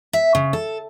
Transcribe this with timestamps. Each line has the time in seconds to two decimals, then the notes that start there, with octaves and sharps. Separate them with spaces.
0.13 E5
0.35 C#3
0.53 A4